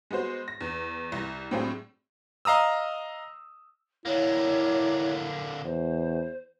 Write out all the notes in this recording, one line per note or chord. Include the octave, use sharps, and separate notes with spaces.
G#3 B3 F#4 C5
A#6
E2
C2 A#6
A2 F#3 C4 D4 F4 G#4
D#5 F5 A#5 D#6 E6
D3 A#3 E4 C#5
E2 C5